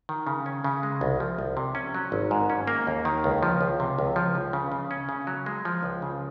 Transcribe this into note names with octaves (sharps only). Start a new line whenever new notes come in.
D#3
C#3
C#4
C#3
G#3
C2
F3
C2
C3
C#4
F#3
G#1
G#2
C#4
A#3
D#2
D#3
C#2
F3
C#2
C3
C#2
F3
C#2
C#3
C#3
C#4
C#3
F#3
G#3
F3
C#2
C#3